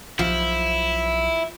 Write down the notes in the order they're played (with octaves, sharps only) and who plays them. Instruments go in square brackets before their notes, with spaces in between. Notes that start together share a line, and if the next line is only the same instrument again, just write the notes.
[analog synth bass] B1 [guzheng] F3 [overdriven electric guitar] E4